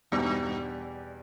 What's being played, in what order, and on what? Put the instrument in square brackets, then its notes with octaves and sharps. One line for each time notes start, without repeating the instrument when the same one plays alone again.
[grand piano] E2 B2 G3 [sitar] G2